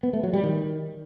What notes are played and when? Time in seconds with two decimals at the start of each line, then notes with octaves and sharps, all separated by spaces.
0.03 B3
0.13 A3
0.23 F#3
0.33 G3
0.43 D#3